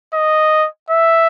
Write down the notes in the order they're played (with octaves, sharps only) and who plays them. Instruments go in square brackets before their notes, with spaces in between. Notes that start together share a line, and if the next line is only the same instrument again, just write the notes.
[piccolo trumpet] D#5
E5